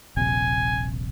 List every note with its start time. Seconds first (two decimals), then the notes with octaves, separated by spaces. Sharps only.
0.17 D#1 A#1 C3 G#5